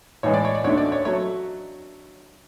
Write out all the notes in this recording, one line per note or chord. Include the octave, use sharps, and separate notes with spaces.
A2 E3 G#3 C#5
D5
C#5
D5
D2 D3 A3 C#5
D5
C#5
F#3 A3 C#5